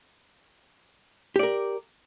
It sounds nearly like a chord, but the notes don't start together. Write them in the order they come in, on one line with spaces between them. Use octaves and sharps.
G4 D5 A#4